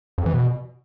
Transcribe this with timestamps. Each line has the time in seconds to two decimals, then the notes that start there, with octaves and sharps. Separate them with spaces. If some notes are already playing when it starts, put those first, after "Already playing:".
0.18 F2
0.26 E3
0.34 B2